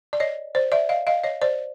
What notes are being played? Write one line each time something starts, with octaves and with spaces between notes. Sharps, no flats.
D5
C#5 D#5
C5 D5
D5 E5
D#5 F5
D#5 F5
C#5 D#5
C5 D5